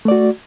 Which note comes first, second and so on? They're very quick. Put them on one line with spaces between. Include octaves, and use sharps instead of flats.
A3 D5 F#4